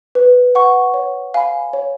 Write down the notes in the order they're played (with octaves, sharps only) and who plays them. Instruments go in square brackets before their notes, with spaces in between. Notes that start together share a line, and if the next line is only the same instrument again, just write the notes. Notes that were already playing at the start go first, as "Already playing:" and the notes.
[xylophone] B4
F#5 C#6
C#5
F5 G#5 B5
C#5